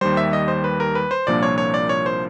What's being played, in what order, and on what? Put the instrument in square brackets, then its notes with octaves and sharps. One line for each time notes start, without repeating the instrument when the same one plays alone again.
[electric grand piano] D#2 D#3 G3 C5
E5
D#5
C5
B4
A#4
B4
C5
C2 A#2 F3 A#3 D4 D5
C#5
C#5
D5
C#5
C5